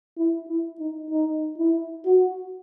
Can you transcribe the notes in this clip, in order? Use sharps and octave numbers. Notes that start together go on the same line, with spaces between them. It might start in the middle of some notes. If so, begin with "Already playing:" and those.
E4
E4
D#4
D#4
E4
F#4